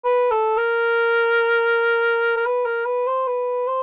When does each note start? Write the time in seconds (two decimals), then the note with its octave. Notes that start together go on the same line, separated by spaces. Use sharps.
0.04 B4
0.31 A4
0.57 A#4
2.37 A#4
2.46 B4
2.65 A#4
2.86 B4
3.07 C5
3.27 B4
3.67 C5